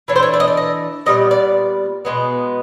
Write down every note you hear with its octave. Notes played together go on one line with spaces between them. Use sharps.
E3 A3 D4 C#5
C5
C#5
D5
D#5
D5
D#5
A#2 G3 B3 D#5
D5
B2 G#3 B3